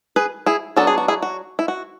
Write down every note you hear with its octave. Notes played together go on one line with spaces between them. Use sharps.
G#4 B4
E4 G#4
F#3 B3 D4 A4
G#4
F#4
E4 G#4
F#4
E4
F#4